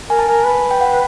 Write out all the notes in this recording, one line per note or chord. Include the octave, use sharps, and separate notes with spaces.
A#4 G#5
A5
A#4 G#5
B4
G5
F#5